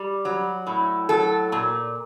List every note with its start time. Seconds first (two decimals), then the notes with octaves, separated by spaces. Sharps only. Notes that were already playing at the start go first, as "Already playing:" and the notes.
Already playing: G3
0.25 F#3
0.67 A2
1.09 F#3 A4
1.52 A#2